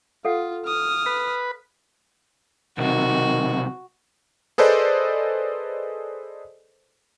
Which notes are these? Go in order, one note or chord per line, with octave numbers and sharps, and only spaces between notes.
F4 A4 F5 F#5
D#6 F6
B4
B1 C3 D#3 F#4
G#4 A4 B4 C5 D5 D#5